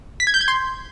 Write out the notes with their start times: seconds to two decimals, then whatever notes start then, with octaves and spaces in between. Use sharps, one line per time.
0.20 B6
0.27 G#6
0.34 G6
0.41 G#6
0.48 C6